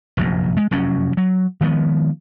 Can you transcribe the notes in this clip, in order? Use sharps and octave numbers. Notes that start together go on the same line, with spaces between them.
F1 A#1 F#2
G#3
F1 F#2 F#3 C#4
F#3
D#3 F3 G#3 B3